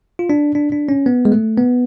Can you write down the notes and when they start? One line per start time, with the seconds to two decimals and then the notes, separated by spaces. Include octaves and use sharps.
0.19 F4
0.30 D4
0.55 D4
0.72 D4
0.89 C#4
1.06 B3
1.25 G#3
1.32 A3
1.57 B3